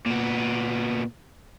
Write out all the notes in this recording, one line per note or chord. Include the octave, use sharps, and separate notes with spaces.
A#2 B3